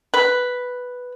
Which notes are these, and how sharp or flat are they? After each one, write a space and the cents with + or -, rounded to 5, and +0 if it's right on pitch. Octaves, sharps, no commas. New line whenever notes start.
B4 +0